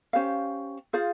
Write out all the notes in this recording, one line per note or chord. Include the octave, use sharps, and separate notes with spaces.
C#4 G4 C5 F5
F4 G#4 C5 F5